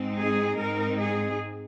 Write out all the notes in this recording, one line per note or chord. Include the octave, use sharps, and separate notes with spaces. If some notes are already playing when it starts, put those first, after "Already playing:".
Already playing: G#2 G#3 C4 D#4
G#4
G#2 G#3 C4 D#4 A#4
G#4